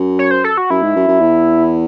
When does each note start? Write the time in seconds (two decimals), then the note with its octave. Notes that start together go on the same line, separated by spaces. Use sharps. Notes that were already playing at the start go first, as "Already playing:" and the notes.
Already playing: F#2
0.19 C#5
0.31 C5
0.44 A4
0.57 F#4
0.70 F#2 E4
0.82 G#2
0.96 F#2
1.08 F#2
1.21 E2